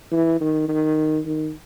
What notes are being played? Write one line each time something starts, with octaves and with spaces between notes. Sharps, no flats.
E3
D#3
D#3
D#3